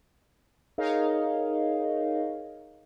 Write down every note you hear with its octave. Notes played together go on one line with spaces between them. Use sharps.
D#4 G#4 A#4 C#5 D#5 F5